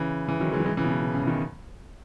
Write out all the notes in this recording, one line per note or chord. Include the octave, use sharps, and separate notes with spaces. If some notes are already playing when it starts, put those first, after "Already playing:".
Already playing: C#3 E3
C#3 E3
D#3 F#3
E3 G#3
F#3
E3 G#3
C#3 E3
B2
C#3
B2
C#3
E3
B2 D#3